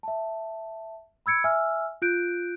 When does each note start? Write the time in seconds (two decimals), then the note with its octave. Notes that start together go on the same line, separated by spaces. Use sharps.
0.03 E5 A5
1.26 B5 E6 G#6 C#7 D7
1.44 E5 G#5 E6 F6
2.02 F4 F#6 G6 D7